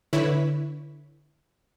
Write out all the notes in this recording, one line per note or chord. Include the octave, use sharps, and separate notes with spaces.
D3 E4 B4 C#5 B6